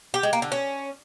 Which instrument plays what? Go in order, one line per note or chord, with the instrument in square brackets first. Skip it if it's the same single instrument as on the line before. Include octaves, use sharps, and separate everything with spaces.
[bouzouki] G4
G#3
A#3
D3
C#4